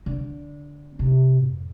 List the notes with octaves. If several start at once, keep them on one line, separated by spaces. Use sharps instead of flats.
D3
C3
F2